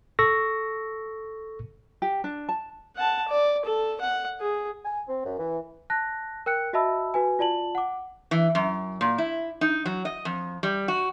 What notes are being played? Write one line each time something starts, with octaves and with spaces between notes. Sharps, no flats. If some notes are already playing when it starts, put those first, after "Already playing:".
A4 C#6 E6 A#6
G4
D4
A5
F#5 A5
D5
A4
F#5
G#4
G#5
C4
F#2
E3
A5 F#6 A#6
A#4 G5 F#6 C#7
F#4 D#5 E5 A5 B5 E6
F#4 B4 G#5
F4 D5 A5 F#7
F#5 D6
E3
F#2
A#2
E4
D#4
F#3
D#5
F2
G3
F#4